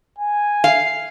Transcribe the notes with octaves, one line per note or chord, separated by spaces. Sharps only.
G#5
F5